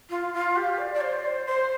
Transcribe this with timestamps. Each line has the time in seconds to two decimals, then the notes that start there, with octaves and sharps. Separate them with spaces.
0.10 F4
0.34 F4
0.57 G4
0.78 D5
0.94 D5
1.01 C5
1.13 D5
1.25 C5
1.46 C5